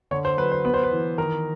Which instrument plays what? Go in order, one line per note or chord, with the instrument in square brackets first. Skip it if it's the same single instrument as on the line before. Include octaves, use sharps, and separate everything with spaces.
[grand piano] D3 C#5
C5
F#3 B4
C5
B3 B4
C5
B4
E3
D#3 A#4